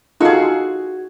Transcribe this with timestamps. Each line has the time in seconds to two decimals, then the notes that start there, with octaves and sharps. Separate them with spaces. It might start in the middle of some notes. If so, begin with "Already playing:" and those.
0.21 D#4 F4 F#4 G#4 A4